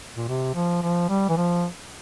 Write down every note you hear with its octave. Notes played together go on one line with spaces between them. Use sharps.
A#2
C3
F3
F3
G3
E3
F3